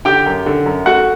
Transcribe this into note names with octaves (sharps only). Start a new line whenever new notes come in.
D3 G4 G5
F#2
D3
F#2
A3 F#4 F#5